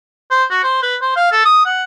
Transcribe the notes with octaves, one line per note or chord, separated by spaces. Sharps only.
C5
F#4
C5
B4
C5
F5
A4
D#6
F#5